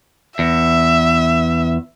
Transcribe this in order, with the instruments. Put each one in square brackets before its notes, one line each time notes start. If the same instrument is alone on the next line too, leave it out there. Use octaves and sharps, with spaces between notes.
[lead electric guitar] E2 [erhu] E5